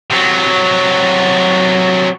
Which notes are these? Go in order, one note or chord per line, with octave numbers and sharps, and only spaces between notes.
C3 F#3